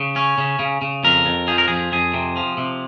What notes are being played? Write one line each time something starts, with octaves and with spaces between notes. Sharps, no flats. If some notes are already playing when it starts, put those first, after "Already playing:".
Already playing: C#3
C#4
C#3
C#3
C#3
F2 A#4
F2
F3 G#4
A#4
F2 G#4
F2 G#4
C3
F3
C3